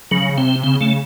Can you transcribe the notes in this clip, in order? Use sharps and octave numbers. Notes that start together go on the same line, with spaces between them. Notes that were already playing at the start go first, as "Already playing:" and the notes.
C#3 F#3
C3 C4
C#3 C4
C#3 A3